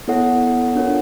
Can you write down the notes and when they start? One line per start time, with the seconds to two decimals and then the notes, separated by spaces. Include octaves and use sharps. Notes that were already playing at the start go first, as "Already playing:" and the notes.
0.08 B3 E4 A4 C#5 F#5
0.76 D4 F4 A#4 C#5 F#5